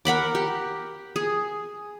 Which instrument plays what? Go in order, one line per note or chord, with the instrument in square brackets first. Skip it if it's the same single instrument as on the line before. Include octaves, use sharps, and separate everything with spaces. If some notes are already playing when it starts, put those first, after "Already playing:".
[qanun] A#4 F#5 B5 D6
G4
G#4